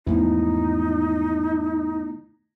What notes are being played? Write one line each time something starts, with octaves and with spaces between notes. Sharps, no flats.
E2 G#2 F3 A3 B3 D#4 E4